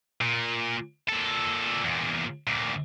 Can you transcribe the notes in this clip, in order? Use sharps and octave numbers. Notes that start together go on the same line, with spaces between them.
A#2
A#2 A4
E2 A#2
D2 A#2